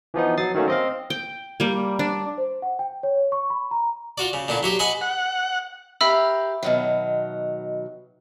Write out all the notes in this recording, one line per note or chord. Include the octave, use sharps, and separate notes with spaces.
E3 F3 B3 D#4
F#3 D#6 A6 C7
D#3 F#3 A3 A#3 C#4
C4 D#5 F5
G5
G3 A#3
D4
C5
F#5
G5
C#5
C#6
B5
A#5
F4 F#4 D5
C#3
A#2 D3 A#3 E4
F#3 F#4 G4
G#4 B4 D#5 F#5 G#5
F#5
G4 A#4 E5 F5 B5 E6
B2 D#3 F#3